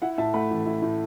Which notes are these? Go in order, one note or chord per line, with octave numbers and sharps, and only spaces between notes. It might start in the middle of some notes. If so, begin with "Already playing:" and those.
E4 F#5
A2 E5 A5
A3 F#5 B5
A1
E4
A2